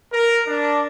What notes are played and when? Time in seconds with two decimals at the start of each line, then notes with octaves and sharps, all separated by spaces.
0.13 A#4
0.47 D4